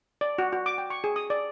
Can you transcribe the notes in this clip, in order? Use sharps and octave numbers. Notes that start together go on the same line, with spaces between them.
D5
F#4
F#4
D6
G5
C#6
G#4
D#6
D5